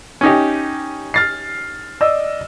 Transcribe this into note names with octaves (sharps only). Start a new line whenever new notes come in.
C#4 D#4 G4
F6 A6 C7
D5 D#5 E6